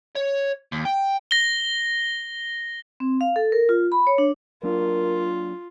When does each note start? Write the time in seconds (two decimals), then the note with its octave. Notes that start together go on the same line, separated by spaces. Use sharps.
0.15 C#5
0.72 D#2
0.85 G5
1.31 A#6 G7
3.00 C4
3.21 F5
3.36 A4
3.52 A#4
3.69 F4
3.92 B5
4.07 C#5
4.18 D4
4.63 F#3 A#3 D4 F4 A#4